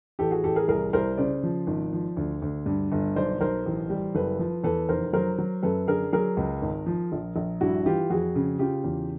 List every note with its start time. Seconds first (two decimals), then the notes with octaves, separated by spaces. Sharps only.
0.19 A1 G4 A4
0.31 F#4 G#4
0.44 A1 G4 A4
0.56 G#4 A#4
0.68 C2 G#4 A#4
0.93 C2 A#4 C5
1.17 C#3 C5 D5
1.43 F3
1.67 G#1
1.93 F3
2.17 D2
2.42 D2
2.66 G2
2.92 G1
3.16 B1 C5 D5
3.41 B1 A#4 C5
3.66 A1
3.90 G3
4.15 F#1 A4 B4
4.39 F3
4.64 E2 A4 B4
4.89 F1 A#4 C5
5.13 F#3 A#4 C5
5.38 F#3
5.63 F#2 A4 B4
5.88 D3 G#4 A#4
6.13 F#3 G#4 A#4
6.37 C#2
6.62 G#1
6.86 F3
7.12 A#1
7.36 A#1
7.61 G2 E4 F#4
7.86 E3 F4 G4
8.10 F2 F#4 G#4
8.36 C#3
8.59 C#3 F4 G4
8.84 E2